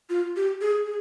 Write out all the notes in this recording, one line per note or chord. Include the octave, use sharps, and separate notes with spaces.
F4
G4
G#4
G#4